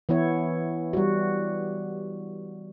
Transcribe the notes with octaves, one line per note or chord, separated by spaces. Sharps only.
E3 B3 E4 C#5
G3 F#4